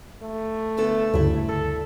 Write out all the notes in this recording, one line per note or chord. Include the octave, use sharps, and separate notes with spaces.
A3
D3 B3 A4
D2 G2 C#3 G3 E4
A4